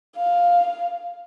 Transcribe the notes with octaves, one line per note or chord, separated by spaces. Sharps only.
F5